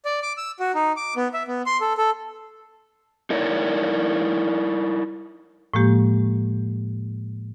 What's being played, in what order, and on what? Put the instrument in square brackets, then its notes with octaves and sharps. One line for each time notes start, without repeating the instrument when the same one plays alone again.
[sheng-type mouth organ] D5
D6
E6
F#4
D#4
D6
B3
E5
B3
C6
A4
A4
[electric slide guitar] D#4 E4 A#4 C#5 D5
[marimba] A2 F3 G#3 A#3 G4